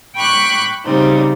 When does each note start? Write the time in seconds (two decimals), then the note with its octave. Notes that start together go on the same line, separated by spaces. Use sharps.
0.15 G5 B5 C#6 D6 F#6
0.84 C#3 G3 C4 D#4